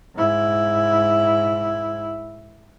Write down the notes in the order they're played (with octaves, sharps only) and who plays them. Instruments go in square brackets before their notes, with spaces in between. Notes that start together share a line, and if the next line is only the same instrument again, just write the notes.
[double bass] G#2 E4